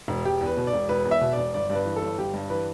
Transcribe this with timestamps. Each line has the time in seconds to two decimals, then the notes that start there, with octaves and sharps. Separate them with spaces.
0.08 E1
0.25 E1 G4
0.41 E2
0.46 B4
0.57 B2
0.67 D5
0.73 E1
0.89 E1 B4
1.05 E2
1.11 E5
1.21 B2
1.33 E1 D5
1.54 G1 D5
1.70 G2 D5
1.75 B4
1.86 E3
1.96 A4
2.02 G1
2.18 G1 G4
2.34 G2
2.50 E3 B4